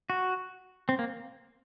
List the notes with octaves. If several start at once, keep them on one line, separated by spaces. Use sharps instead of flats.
F#4
C4
A#3